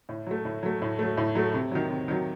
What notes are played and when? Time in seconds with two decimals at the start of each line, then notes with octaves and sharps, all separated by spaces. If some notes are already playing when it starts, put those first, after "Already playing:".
0.09 A2
0.27 F#3 A3
0.45 A2
0.63 F#3 A3
0.82 A2
0.99 F#3 A3
1.17 A2
1.35 F#3 A3
1.54 C3
1.72 D#3 F#3
1.90 C3
2.08 D#3 F#3